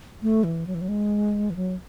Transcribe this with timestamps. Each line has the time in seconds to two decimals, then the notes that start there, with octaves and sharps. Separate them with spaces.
0.22 A3
0.44 E3
0.67 F#3
0.75 E3
0.81 F#3
0.89 G#3
1.50 E3
1.56 F#3